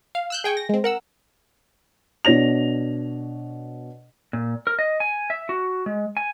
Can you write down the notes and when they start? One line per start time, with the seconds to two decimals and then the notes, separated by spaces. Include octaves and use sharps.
0.15 F5
0.30 E6 F#6 G6
0.44 G#4 G5 G#5 C#6
0.57 A#6
0.69 G#3 C4
0.84 A#4 F#5 E6
2.25 B2 D4 C#5 A#6 F7
4.33 A#2
4.67 A#4
4.79 D#5
5.00 G#5
5.30 E5
5.49 F#4
5.86 G#3
6.17 G#5